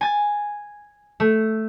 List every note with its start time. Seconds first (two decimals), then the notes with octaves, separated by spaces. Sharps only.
0.01 G#5 A6
1.20 A3